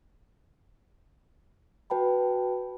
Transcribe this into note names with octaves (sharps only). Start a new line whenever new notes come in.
F#4 B4 G5 A5 B5